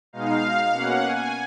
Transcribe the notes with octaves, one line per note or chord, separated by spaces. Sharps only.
B2 G#3 D#4 F5
B2 A#3 C#4 F#5
G#5